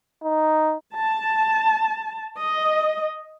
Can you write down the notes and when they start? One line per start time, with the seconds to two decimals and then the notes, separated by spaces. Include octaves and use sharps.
0.24 D#4
0.94 A5
2.38 D#5